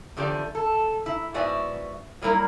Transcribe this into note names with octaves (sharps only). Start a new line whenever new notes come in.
E2 D3 F3 G4 D5
A4
E4
G#2 B3 F#4 D5 E5 G#5
F#3 G3 A#3 E4 A#4